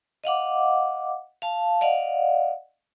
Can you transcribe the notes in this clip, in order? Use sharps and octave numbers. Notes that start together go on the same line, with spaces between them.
D#5 F5 F#5 D6
F5 A5
D5 D#5 F5 F#5